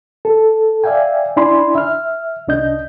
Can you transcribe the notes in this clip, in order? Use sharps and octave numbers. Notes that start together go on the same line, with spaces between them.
A4
D5 E5 F5 G5 G#5
D4 E4 D5 G#5 B5 C6
E5 F6
C2 D4 D#5 G6